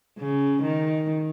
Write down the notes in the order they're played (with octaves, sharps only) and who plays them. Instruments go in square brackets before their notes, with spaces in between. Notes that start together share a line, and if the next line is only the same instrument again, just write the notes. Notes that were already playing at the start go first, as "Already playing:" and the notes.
[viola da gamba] C#3
D#3